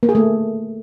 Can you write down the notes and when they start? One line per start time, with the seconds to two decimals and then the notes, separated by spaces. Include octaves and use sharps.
0.03 A#3
0.09 G#4
0.15 A3